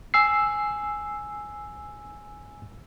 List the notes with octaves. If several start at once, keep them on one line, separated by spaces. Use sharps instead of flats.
G#5 E6 C7